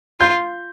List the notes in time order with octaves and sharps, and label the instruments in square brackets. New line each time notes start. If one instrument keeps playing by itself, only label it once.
[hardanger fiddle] F4 [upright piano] G6